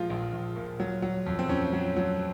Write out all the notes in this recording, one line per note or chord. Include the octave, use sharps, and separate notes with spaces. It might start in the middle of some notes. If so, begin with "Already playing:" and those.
Already playing: A#2 F3 G#3 F4
A#1
A#1
A#2
F#3
F#3
F2
C4
F2 C#4
F#3
F#3